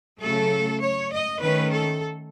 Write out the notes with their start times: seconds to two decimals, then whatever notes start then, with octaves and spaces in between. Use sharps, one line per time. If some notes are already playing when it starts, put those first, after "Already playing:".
0.20 C#3 F#3 A3 A4
0.81 C#5
1.12 D#5
1.41 D#3 A3 C#4 B4
1.71 A4